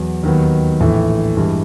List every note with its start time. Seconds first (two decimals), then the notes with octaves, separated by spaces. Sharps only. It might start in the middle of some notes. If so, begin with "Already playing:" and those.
Already playing: E2 F#3
0.23 D#2 D#3 F#3 B3
0.80 A#1 A2 E3 A3
1.37 G2 E3 G#3